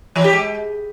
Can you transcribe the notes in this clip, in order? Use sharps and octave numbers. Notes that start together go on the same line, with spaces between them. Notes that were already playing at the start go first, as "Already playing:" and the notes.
E3
G4
G#3